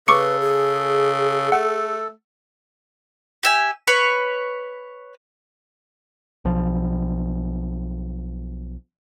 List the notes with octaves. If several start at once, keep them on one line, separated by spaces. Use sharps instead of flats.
C#3 A4 B4 C#6 D6 C#7
G#4
A3 F#5
G4 E5 G#5
B4 C#5 B5
B1 F3